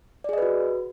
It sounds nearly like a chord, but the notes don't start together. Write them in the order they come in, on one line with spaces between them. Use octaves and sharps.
D5 G#4 D#5 B4 F#4